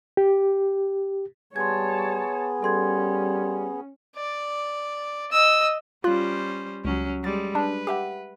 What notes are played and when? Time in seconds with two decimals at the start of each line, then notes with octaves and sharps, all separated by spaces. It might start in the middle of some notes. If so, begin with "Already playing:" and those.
0.17 G4
1.56 G3 B3 G#4 C#5 A5 C6 G#6
2.63 G3 C#4 A4 C6 G#6
4.16 D5
5.32 D#5 E6
6.04 G3 C#4 F4 C5 F#6
6.85 C#2 F#3 C#4
7.24 G3 G#3 A6
7.55 D4 B4
7.87 G4 E5 F#5